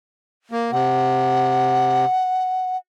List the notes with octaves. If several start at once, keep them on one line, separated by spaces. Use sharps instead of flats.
A#3
C3 F#5